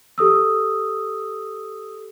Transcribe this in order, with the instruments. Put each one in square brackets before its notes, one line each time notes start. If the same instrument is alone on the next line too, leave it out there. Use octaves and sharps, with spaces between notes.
[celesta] G4 A4 D#6 E6